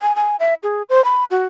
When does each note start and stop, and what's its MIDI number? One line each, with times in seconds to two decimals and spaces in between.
0.01 0.15 80
0.16 0.36 80
0.40 0.54 76
0.63 0.82 68
0.89 1.04 72
1.05 1.24 83
1.31 1.46 66